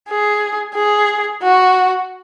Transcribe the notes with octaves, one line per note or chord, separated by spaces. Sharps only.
G#4
G#4
F#4